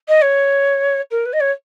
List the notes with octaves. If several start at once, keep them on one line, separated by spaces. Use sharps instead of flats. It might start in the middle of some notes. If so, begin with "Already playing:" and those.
D#5
C#5
A#4
B4
D#5
C#5